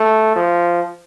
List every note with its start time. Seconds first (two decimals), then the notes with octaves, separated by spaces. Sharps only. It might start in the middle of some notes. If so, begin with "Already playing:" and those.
Already playing: A3
0.36 F3